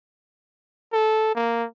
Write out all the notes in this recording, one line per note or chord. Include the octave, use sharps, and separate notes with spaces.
A4
A#3